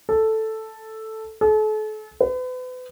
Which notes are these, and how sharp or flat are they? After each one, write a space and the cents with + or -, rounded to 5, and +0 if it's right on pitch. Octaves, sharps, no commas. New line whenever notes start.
A4 +0
A4 -40
B4 +40